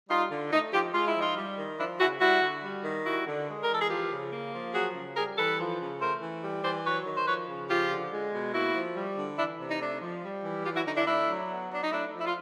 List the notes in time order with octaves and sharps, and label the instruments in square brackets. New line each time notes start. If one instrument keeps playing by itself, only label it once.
[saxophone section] G3 D#4 F4
D3
A3 D#4
F3 F4 G4
G#3 F4
E4
F3
D#4 F4
G3
D#3
F3 D4 E4
C#3 E4 F#4
G3 E4 F#4
D3
G3
D#3
G3 E4 F#4
D3
G#3
A#4
E3 A4
G#4
F3 F4 G4
C#3
A#3
F3
F#3 F#4 G#4
C#3
G3 G#4 A#4
E3 A4 B4
F3
C#3
A3 A#4 C5
E3
G3
E3 C5 D5
F#3 B4 C#5
D#3
C5
F3 B4 C#5
C#3
F3 F4 G4
D3
G#3
B2
A#3 E4 F#4
F3
G3
D3
E3 D4 E4
C3
D#4
A3 D4
F3
G3
E3
F#3 F4 G4
E4 F#4
D3 D#4
D4 E4
A3 D4 E4
F#3
B3
F#3 D4
D#4
A3 D4 E4
F3
E4
F4